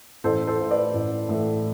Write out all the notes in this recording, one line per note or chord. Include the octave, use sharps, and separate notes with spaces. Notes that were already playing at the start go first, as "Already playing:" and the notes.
A1 A4 C5
A4 C5
A2 E3 A3
B4 D5
A1
A2 E3 A3